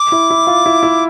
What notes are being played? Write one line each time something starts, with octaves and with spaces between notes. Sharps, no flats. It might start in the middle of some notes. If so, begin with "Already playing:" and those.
Already playing: D6
E4
E4
F4
E4
E4